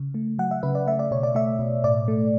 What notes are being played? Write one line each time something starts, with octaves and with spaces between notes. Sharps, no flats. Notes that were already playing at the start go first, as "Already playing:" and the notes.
Already playing: C#3
A3
F#3 F#5
E5
C#3 B4
D5
A3 E5
D5
B2 C#5
D5
A3 E5
B2
A2 D5
A3